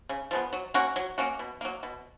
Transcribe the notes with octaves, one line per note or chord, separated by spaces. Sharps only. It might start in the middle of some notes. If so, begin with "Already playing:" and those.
C#3
F3 G#3 B3
F#3
A#3 C#4 F#4
F#3
A#3 C#4 F#4
B2
F#3 A#3
B2